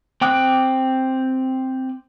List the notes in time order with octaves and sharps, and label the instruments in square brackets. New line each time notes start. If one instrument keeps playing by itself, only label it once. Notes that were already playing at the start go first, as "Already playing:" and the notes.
[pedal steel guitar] C4 G5 D6 D#6 F#6